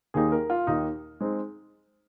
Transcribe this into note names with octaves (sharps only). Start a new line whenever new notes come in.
D#2 D#3 A#3 D#4 G#4
A#4
F4
D#2 D#3 A#3 D#4
G#3 C4 D#4